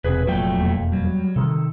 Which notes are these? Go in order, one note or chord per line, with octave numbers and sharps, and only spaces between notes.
E1 C3 G#4 B4
F1 F2 A#2 F#3 A3 G5
E1 F2 A#3
F#3 G3
C3 D#3 A4